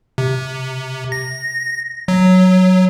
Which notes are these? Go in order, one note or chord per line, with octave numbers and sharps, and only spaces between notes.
C3
A#6
F#3